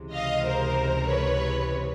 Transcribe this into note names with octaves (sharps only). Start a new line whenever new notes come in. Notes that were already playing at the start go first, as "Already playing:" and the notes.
Already playing: C#2 C3 E3 G#3
D#5 F5
A#4 C5
B4 C#5